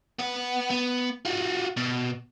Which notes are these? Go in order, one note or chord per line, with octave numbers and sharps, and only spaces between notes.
B3 F#5
B3
F4 F#4
B2